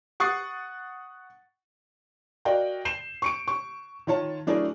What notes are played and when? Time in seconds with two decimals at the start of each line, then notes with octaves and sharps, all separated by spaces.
0.20 F#5 C#6 D#6 A6 C7
2.45 F#4 A#4 D5 D#5 F5 G5
2.85 G6 C7 E7
3.22 C#6 C#7 D7
3.48 C#6
4.07 D#3 F4 C#5 A5
4.47 F#3 A3 D4 E4 G#4 A#4